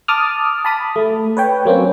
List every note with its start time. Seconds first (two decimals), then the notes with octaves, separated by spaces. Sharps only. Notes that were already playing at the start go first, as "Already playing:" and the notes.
0.08 A5 D6 D#6 F6
0.65 A5 B5 D#6
0.96 A3
1.37 B4 C#5 G5
1.65 F#3 A#3 C4 C#4